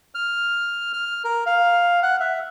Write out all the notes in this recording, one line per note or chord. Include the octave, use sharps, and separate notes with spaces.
F6
F6
A#4
F5
F#5
E5